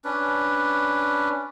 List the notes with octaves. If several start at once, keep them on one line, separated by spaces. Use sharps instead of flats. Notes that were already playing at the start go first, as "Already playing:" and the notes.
C#4 D4 B4